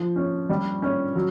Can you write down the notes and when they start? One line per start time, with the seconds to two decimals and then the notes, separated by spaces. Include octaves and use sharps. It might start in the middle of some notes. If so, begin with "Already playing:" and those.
Already playing: F3
0.16 C#4
0.49 G3
0.82 C#4
1.15 F#3